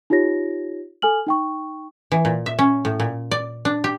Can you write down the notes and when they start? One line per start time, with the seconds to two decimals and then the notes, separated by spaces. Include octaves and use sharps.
0.10 D#4 F4 G4 C#5 A#6
1.02 A4 G#5 F6 F#7
1.27 D#4 G5 C#6
2.12 E3
2.25 A#2
2.46 E5
2.59 C#4
2.85 A2
3.00 A#2
3.31 D5
3.65 D4
3.84 G4